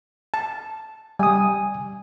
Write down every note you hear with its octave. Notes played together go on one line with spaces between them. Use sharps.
A5
G3 G#5 D#6